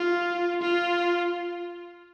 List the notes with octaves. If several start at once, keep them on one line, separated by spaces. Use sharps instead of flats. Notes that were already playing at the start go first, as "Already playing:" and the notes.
Already playing: F4
F4